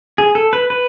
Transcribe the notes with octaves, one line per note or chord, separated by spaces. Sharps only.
G#4
A4
B4
B4